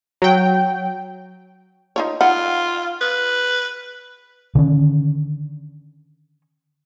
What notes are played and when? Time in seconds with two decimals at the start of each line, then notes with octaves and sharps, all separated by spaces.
0.22 F#3 G5
1.96 D#4 F4 C#5
2.21 D#4 F4 F#5 B5
3.01 B4
4.55 D3 D#3 C#4